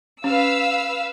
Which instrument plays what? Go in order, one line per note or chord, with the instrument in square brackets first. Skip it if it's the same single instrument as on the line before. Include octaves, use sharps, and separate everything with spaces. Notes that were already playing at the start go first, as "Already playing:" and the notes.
[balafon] C#4 [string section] B4 F5 E6